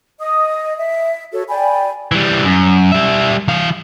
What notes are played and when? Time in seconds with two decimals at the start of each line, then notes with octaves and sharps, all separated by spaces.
0.19 D#5 D#6
0.77 E5
1.32 F#4 A4 C#5
1.49 D5 G5 G#5 B5
2.12 E3 G3
2.44 F#2
2.92 G3 E5
3.48 E3 F5